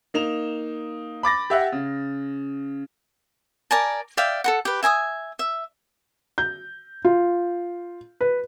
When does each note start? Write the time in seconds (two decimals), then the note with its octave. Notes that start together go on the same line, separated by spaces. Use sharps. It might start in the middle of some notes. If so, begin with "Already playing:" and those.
0.14 A#3 D#4 E7 F7
1.23 B5 D6 A6 A#6
1.50 G4 E5 F#5
1.72 C#3
3.71 A#4 D5 G#5 A5
4.17 D5 E5 F5 G5
4.44 A4 A#4 F#5
4.65 G4 B4
4.83 E5 G#5 A#5 D#6
5.39 E5
6.38 G6
7.05 F4
8.21 B4